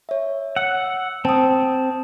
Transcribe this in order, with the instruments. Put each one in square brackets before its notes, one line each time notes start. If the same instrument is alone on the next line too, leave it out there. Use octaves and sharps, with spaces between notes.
[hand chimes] C#5 E5
[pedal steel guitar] F#5 [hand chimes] E6 C#7
[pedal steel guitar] C4 [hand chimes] A5 D#6